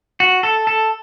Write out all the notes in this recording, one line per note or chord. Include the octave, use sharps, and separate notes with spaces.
F#4
A4
A4